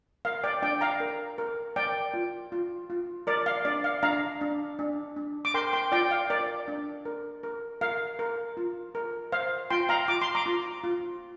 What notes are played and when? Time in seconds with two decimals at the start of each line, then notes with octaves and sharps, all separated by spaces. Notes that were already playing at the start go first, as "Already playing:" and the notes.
0.25 A#4 F5
0.44 D5 G5
0.62 D4 D5 G5
0.81 F5 A#5
1.00 A#4
1.38 A#4
1.76 A#4 D5 G5
2.14 F4
2.52 F4
2.90 F4
3.27 A#4 D5
3.46 F5
3.65 D4 D5
3.84 F5
4.03 D4 F5 A#5
4.41 D4
4.79 D4
5.16 D4
5.45 D6
5.54 A#4 G5 C6
5.73 G5 C6
5.92 F4 D5 G5
6.11 F5
6.30 A#4 D5
6.68 D4
7.05 A#4
7.43 A#4
7.81 A#4 F5
8.19 A#4
8.57 F4
8.95 A#4
9.32 C5 F5
9.70 F4 G5 C6
9.89 F5 A#5
10.08 F4 D6
10.22 C6
10.35 A#5 D6
10.46 F4
10.84 F4